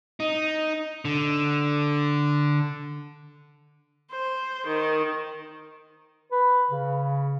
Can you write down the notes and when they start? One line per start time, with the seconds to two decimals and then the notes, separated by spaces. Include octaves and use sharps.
0.20 D#4
1.05 D3
4.12 C5
4.67 D#3
6.31 B4
6.70 C#3